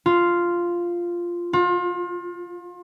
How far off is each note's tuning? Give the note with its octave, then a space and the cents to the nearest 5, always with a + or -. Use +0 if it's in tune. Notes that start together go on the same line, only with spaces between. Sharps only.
F4 -5
F4 +30